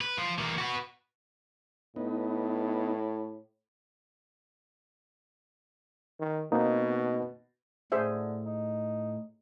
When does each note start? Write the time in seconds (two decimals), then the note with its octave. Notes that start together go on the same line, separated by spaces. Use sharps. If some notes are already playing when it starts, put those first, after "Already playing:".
0.01 B4
0.18 F3 F4
0.38 E3 A#3
0.58 F#4 B4
1.96 A2 B3 D#4
6.19 D#3
6.52 B2 A#3 C4 D#4
7.92 A2 D3 G#4 C5 E5
8.46 D#4